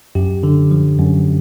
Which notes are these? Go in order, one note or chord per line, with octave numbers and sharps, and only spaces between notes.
F#2 G4
D3
F3
F#2